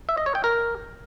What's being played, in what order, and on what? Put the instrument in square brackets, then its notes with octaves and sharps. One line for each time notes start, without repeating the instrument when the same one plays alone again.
[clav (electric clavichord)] E5
D#5
C#5
G5
A#4